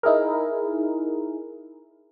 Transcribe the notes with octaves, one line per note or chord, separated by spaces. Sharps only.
D#4 E4 G#4 A#4